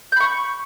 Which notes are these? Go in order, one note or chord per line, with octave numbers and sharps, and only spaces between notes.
B5 C#6 G6